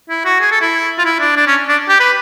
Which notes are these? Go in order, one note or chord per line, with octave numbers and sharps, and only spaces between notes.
E4
F#4
G#4
A4
E4
F4
E4
D4
D4
C#4
D4
G4
B4